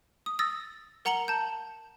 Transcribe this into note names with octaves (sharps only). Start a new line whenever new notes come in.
D#6
D#6 E6 A6 A#6
A#4 F#5 A#5 C#7 F#7 G7
A5 G6